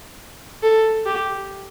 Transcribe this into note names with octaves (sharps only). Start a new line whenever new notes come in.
A4
G4